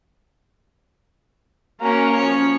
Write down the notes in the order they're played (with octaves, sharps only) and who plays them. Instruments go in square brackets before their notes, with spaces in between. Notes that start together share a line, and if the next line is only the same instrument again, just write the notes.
[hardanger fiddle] A#3 C#4 [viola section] F#4 F5 A#5
[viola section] F3 C#4 [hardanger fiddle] C#5